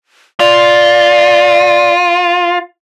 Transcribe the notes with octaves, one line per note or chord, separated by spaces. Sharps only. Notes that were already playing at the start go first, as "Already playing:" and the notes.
F4 D5